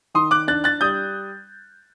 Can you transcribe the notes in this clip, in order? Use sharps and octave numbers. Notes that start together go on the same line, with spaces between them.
D#3 C6 D#6
D6 F#6
D4 F#6 A6
F#6 A6
G3 D#6 G6